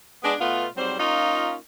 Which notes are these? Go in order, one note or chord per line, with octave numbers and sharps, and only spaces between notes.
G#3 B3 D4
B2 A3 B3 F4
G#2 F#3 G3 C4 C5
A#3 C#4 D#4 F4